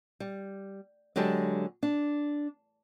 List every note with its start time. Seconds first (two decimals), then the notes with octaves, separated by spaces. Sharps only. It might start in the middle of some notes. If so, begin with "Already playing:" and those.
0.20 G3
1.16 D3 F#3 G#3 G4 A4
1.83 D4